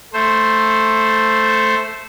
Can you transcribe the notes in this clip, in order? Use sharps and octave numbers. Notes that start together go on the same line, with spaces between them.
A3 C5